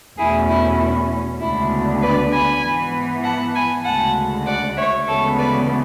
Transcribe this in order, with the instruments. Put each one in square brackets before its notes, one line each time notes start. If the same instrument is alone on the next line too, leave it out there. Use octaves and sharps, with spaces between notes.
[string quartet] E2 B2 A3 C#4 E4 G#4
E4
E4
D2 C#3 G#3 B3 D4 E4
B4 D5
G#5 B5
G#2 E3 B3
F#5 A5
G#5 B5
D2 C#3 G#3 F#5 A5
D5 F#5
C#5 E5
D2 C#3 E3 G#3 B3 A4 C#5
B4 D5